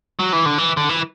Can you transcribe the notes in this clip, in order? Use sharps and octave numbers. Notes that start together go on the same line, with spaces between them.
F#3
E3
D3
E3
D3
E3